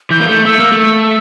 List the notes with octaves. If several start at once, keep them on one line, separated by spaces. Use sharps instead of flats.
E3 G6
A#3
A3
A3 E6
A#3
A3
E6